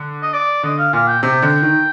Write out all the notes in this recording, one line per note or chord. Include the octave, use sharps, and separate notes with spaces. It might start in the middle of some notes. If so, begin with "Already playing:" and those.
Already playing: D3
D#5
D5
D3 D#5
F5
A#2 F5
G5
C3 G5
D3
D#3